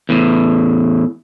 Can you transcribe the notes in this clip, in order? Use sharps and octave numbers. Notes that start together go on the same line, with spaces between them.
E2 A2